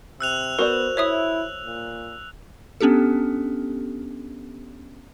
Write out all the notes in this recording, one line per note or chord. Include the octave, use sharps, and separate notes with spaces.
C3 E6 F#6 F7
B3 F#4 A#4 C5 D5
E4 C#5 E5 D#6
A#2
B3 C#4 D4 G4 A4